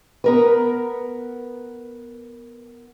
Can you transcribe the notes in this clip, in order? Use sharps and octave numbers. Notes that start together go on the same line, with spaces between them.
B3 A#4 B4